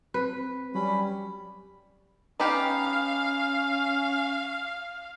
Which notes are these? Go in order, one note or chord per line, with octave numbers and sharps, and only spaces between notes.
C4 B4
F#3 G3 C#4 B5
B3 C#4 D#4 G4 F5